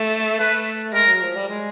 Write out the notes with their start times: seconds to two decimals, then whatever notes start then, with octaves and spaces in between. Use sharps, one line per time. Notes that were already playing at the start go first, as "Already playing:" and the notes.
Already playing: A3
0.39 A3 B4
0.94 G#3 A#4
1.07 F#3
1.21 F3
1.35 G3
1.48 G#3